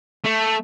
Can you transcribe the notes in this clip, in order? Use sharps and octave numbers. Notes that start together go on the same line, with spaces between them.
A3